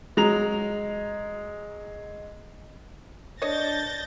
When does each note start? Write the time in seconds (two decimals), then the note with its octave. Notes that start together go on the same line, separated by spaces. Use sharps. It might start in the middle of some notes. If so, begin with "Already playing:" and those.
0.17 F#3 G#3 A#5 F7
3.42 D4 C#5 D#5 G6 A6 A#6